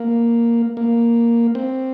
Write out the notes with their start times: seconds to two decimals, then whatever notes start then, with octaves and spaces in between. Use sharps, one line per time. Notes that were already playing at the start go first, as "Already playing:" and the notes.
Already playing: A#3
0.77 A#3
1.55 C4